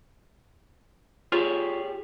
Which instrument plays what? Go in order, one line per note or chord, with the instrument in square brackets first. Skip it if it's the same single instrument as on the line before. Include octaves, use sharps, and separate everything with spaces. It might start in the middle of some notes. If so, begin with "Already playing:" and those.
[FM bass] F4 [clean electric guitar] G4 G#4 C#5